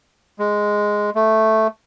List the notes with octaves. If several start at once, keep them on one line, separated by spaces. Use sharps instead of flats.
G#3
A3